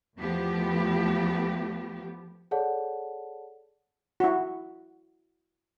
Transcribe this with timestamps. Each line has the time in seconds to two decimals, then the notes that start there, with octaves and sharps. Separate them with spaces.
0.18 E2 F3 A3 B3 G4
2.51 G#4 A4 C#5 D5 F#5 A5
4.20 E4 F#4